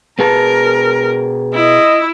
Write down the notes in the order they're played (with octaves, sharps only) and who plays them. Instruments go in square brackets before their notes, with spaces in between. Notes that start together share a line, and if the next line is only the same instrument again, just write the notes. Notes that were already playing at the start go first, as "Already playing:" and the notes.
[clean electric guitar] B2 G#4 A5 [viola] A#4 [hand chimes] B4
[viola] E4 [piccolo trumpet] D#5